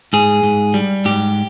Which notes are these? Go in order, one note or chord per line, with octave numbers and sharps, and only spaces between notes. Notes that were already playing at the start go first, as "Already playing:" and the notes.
G#2 G#4
G#2
G3
G#2 G4